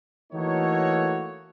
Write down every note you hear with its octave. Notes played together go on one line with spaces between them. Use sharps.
E3 A3 A#3 D#4 F#4 C#5